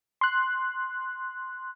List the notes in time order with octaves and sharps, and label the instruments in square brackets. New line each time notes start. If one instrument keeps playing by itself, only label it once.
[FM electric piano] C6 F#6